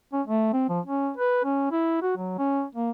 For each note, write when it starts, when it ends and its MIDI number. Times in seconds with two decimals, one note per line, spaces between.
0.13 0.22 61
0.27 0.51 57
0.53 0.66 60
0.69 0.80 53
0.86 1.11 61
1.17 1.41 71
1.44 1.71 61
1.71 2.01 64
2.02 2.17 66
2.17 2.37 54
2.38 2.64 61
2.75 2.91 58